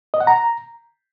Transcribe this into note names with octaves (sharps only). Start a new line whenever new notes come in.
D#5
F#5
A#5